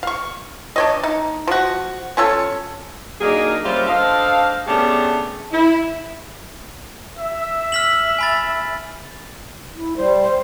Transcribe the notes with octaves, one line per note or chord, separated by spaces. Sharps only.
F5 C#6
D4 C#5 D#5
D#4
F3 F#4
C#4 F4 A4 C#5
F#3 A#3 D4 D#4 G#4
G3 A#3 C#4 F4 C5 E5
D4 A4 C5 D#5 F5
A3 B3 C#4 D4 G4 G#4
E4
E5
F6 B6 F#7
G#5 B5 A6
E4
G3 C5
C5